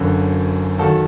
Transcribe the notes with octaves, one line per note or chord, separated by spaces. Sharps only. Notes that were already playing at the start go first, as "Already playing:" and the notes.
Already playing: F#1 F#2 D3
D#2 D#3 F#3 F#4 A4